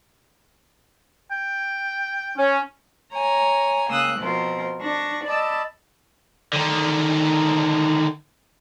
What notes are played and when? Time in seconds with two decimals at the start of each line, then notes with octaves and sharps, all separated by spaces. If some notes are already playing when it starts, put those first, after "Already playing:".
1.31 G5
2.37 C#4
3.11 C#5 G#5 A#5
3.88 C#3 A#3 G5 D#6 E6 F#6
4.17 B2 F3 C4 F4 A#4
4.81 D4 C#6 A#6
5.25 D5 D#5 A5 B5 E6
6.53 D3 D#3